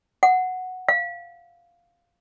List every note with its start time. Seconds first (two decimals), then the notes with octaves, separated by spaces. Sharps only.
0.23 F#5
0.89 F5